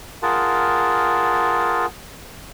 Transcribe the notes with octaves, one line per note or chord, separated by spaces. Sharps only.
F4 G#4 A#4 F#5 A5